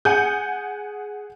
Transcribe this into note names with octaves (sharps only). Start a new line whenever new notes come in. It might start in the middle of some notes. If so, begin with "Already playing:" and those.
G#4 F#5 G#5 G6